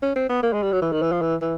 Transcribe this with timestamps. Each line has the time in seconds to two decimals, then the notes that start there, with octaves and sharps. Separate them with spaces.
0.03 C#4
0.16 C4
0.29 B3
0.43 A#3
0.53 G#3
0.62 G3
0.72 F#3
0.82 E3
0.92 D#3
1.02 E3
1.12 F3
1.22 E3
1.42 E3